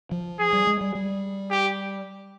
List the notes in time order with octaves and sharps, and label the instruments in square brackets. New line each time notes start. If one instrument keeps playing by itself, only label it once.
[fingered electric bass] F3
[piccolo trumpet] G#4
[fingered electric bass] G3
G#3
G3
G3
[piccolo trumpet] G4